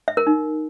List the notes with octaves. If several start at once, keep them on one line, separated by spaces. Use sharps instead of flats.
E5
A#4
D#4